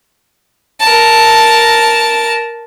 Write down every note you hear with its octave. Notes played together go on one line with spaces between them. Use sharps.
A#4 A5